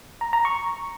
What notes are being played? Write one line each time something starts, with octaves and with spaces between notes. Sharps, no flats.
A#5
A#5
C#6